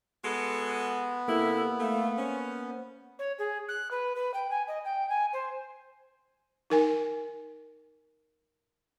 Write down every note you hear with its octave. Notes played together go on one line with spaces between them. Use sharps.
G#3 B3 F#4 A4
C3 A#3 E4 A4
A3 F5
C#4 C5
C#5
G#4
F#6
B4
B4
G5
G#5
D#5
G5
G#5
C5
D#4 A#4 G#5